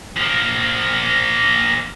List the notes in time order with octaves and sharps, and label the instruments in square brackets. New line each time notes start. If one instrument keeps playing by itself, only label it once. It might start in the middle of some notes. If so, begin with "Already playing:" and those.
[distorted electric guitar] F3 A#3